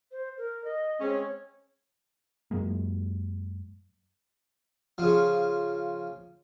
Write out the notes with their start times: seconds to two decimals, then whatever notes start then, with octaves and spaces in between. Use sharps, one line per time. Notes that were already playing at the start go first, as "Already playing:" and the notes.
0.12 C5
0.38 A#4
0.65 D#5
1.00 G#3 C4 C#4 C#5
2.51 F#2 F#3 G#3 A#3
4.98 C#3 F3